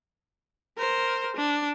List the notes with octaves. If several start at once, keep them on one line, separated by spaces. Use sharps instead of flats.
A#4 C5
D4